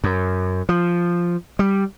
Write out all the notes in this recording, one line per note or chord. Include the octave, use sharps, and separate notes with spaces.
F#2
F3
G3